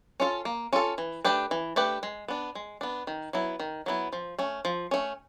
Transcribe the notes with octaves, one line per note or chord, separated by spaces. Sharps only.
C#4 F4 A4
A#3
C#4 F4 A4
E3
A3 D4 G4 B4
E3
A3 D4 G4 B4
G#3
B3 D4
G#3
B3 D4
D#3
F#3 B3 E4
D#3
F#3 B3 E4
F3
A3 C#4
F3
A3 C#4